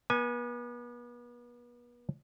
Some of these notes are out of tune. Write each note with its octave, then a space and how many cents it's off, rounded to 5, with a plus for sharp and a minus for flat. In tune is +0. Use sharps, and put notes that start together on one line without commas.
B3 -35 G#5 +0